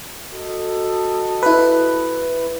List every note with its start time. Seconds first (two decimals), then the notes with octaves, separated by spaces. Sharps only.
0.31 F#4 A4 D#5
1.43 E4 B4